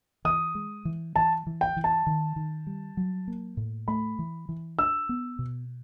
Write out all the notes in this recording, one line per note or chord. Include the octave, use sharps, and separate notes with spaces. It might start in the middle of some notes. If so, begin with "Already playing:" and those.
E3 D#6
G#3
E3
E3 A5
E3
G5
E3
A5
D#3
D#3
G3
F#3
A#3
A2
A3 B5
E3
E3
D4 E6
B3
B2